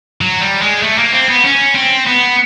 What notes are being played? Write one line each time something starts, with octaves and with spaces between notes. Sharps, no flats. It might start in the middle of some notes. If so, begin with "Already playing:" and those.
F#3
G3
G#3
A3
A#3
C4
B3
C#4
C4
B3